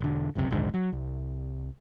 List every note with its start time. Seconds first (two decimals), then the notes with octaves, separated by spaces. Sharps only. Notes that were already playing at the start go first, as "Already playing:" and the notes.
0.01 E1 D3
0.35 G1 C#2 F#2 C3
0.51 A#1 D#2 G#2 D3
0.74 F#3
0.92 C2